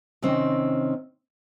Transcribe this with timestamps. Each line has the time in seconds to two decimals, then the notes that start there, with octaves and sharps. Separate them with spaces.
0.22 C3 D#3 C4 C#4